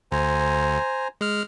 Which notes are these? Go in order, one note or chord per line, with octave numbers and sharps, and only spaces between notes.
D2 C5 G#5 A#5
G#3 F6